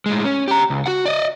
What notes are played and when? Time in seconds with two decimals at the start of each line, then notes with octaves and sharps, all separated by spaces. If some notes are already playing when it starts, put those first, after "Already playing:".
0.06 A2 G#3
0.25 C#4
0.48 G4 A#5
0.70 C#2
0.86 F#4 F#5
1.06 D5 D#5